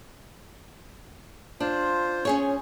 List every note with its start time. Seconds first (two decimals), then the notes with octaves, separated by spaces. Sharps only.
1.60 D4 F4 C5
2.25 C#4 G#4 C#5